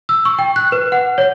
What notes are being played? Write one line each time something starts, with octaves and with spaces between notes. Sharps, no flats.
E6
C#6
G5
F#6
B4
F#5
C#5